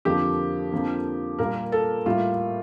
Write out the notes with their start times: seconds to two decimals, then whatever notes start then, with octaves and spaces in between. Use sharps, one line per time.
0.05 F2 D3 F3 A#3 G4
0.72 F2 D3 F3 A#3
1.39 A#2 G3 A#3 A#4
1.72 A4
2.06 A2 G3 A#3 F4